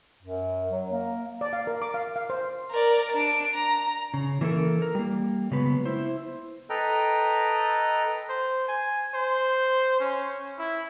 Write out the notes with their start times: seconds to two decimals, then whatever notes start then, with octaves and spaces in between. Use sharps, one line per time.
0.23 F#2
0.71 F#3
0.91 A#3
1.41 D5
1.53 F5
1.67 A#4
1.82 D6
1.94 F5
2.16 F5
2.30 C5
2.71 A#4 D5
3.12 D4 D7
3.55 A#5
4.14 C#3
4.41 E3 A#3 C#4 F4 A4 A#4
4.82 A#4
4.95 G3 A#3
5.51 C#3 F#3 G#3 B3 B4
5.86 E4 C5
6.70 A4 B4 D#5 G5 A#5
8.29 C5
8.68 G#5
9.14 C5
10.00 C#4
10.59 E4